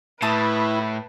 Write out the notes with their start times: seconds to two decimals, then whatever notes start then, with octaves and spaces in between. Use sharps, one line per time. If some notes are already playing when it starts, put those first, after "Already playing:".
0.22 A2 E4 B4 A5 D#6